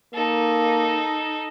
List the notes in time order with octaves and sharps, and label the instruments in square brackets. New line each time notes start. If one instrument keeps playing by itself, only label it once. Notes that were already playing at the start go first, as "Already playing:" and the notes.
[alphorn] A#3 [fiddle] D#4 A4